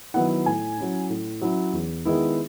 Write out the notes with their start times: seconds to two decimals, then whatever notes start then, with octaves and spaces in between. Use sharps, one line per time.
0.14 D#3 F#3 B3 E4 F#5
0.46 A2 G#5
0.78 F#3 C#4 E4
1.10 A2
1.41 F#3 C#4 E4
1.73 E2
2.05 D#3 G#3 B3 E4